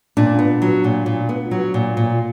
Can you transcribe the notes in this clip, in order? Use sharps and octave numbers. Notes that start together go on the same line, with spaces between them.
A#2 D4
B3
F#3
A#2
A#2
B3
F#3
A#2
A#2